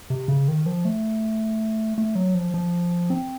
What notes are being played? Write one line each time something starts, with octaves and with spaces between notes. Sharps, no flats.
C3
C#3
D#3
F3
A3
A3
F#3
F3
F3
C4